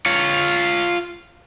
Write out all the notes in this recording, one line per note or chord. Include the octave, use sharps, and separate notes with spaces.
F4 C#5